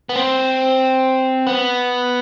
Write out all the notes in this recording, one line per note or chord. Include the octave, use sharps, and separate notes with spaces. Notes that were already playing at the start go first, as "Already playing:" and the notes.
B3
C4
B3